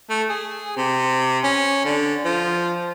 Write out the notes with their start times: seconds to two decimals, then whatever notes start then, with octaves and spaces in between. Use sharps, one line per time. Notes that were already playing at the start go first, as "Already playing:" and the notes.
0.10 A3
0.29 G#4
0.77 C3
1.44 C#4
1.85 D3
2.25 F3